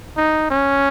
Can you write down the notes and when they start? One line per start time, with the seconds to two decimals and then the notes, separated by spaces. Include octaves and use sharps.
0.17 D#4
0.51 C#4